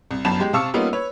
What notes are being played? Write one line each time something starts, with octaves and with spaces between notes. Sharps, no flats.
C2
G1 F#2 A5 B5 E7
G#3 G4
C3 F5 A5 C#6 E6 C#7
G3 A#3 B3 C#4 D#4 F4
B4 C#5